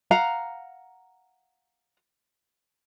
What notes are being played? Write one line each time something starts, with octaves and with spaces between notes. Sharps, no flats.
F5 F#5 A#5